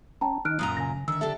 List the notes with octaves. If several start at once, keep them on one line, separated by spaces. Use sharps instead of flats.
C#4 G5 A5 A#5
D#3 D#4 F6 F#6 D7
F#2 A#2 A#5 D#6
C#3 G#5 A#6
D3 D#3 E5 E6
D4 G4 A4 E5